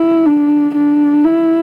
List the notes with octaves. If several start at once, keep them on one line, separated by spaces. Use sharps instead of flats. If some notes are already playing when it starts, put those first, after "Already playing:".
Already playing: E4
D4
D4
E4